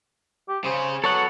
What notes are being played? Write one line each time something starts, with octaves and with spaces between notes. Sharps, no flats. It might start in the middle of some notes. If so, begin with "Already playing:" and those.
G4
C#3 G#4 C5
F#3 B3 A4 C#5 F#5